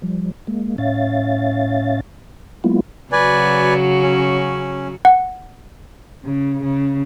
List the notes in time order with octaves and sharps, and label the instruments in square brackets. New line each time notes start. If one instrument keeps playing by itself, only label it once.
[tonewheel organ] F3 G3
G#3 A#3
A2 C#4 C#5 E5 F5 A6
F#3 G#3 A#3 B3 E4 F4
[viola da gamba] C#3 F#3 F#4 [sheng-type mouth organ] B4 D5 G#5
[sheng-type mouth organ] C#4
[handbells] F#5
[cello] C#3
C#3